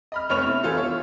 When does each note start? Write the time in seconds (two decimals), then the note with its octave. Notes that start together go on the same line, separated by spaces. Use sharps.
0.12 D#5 B5 F6
0.29 F1 B3 B4 C#5 F6 F7
0.46 E4
0.63 E3 B3 F4 A4 C5
0.77 C#5